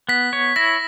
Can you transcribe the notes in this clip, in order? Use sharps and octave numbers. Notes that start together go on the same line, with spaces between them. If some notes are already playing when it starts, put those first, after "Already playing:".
B3 B6
C#5
E4 A#6